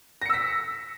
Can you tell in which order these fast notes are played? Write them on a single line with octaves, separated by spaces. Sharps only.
A#6 C#7 E6 B6